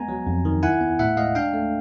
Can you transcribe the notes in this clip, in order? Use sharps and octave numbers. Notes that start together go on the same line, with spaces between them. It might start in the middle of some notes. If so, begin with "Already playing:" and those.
Already playing: G#3 B3 G#5 A#5
F#3
F2
D#3
E4 F#5 G#5
B3
A2 E5 F#5
G#3 D#5 F5
D4 F5 G5
A3